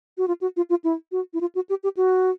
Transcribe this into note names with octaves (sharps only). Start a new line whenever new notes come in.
F#4
F4
F#4
F4
F4
E4
F#4
E4
F4
F#4
G4
G4
F#4